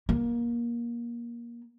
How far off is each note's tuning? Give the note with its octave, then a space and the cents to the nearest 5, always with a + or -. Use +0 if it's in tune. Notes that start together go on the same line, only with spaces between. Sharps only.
A#3 +20